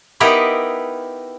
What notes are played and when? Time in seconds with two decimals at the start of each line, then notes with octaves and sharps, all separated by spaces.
0.20 B3 D#4 E4 G4 A#4 B4